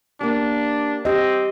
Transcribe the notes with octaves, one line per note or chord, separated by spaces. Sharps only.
A#3 D4 G4
C4 G4 D#5